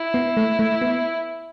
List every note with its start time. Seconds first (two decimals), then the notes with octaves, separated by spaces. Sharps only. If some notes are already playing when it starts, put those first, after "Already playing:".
Already playing: E4
0.14 B3
0.37 A3
0.59 A3
0.81 B3